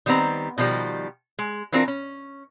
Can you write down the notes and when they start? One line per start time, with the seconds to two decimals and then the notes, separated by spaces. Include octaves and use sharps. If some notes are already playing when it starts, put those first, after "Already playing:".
0.06 D#3 G3 B3 C4 A#5
0.58 B2 D#3 F3 G3
1.39 G#3
1.72 E3 B3 C4 D4 F4 A#4
1.88 C#4